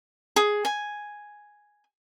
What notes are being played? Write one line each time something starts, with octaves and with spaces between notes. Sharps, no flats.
G#4
G#5